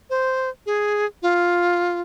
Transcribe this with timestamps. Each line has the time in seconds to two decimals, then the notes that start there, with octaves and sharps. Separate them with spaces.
0.10 C5
0.66 G#4
1.22 F4